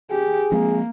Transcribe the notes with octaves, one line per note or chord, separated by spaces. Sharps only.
G4 G#4
F3 G#3 A#3 C4